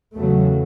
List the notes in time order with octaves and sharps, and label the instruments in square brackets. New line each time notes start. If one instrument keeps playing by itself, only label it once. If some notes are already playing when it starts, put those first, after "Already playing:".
[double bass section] E2 C#3 F#3 A3